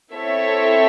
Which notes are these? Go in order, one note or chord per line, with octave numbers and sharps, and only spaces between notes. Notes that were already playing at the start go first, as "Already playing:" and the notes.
C4 E4 A4 C#5 E5